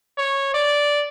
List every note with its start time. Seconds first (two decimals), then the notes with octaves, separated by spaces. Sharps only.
0.18 C#5
0.54 D5